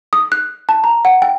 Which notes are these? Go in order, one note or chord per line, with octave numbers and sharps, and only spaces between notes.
D#6
F#6
A5
A#5
F#5
G5